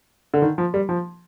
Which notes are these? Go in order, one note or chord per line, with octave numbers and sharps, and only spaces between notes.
D3
D#3
F3
G3
F3